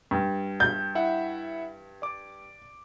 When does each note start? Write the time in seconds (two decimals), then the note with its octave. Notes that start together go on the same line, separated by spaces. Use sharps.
0.11 G2
0.60 G6
0.95 E4 E5 F#5
2.02 D5 D6